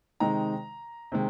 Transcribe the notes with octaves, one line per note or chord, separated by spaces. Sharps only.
C3 D#3 G#3 D#4 A#5
C3 D#3 G#3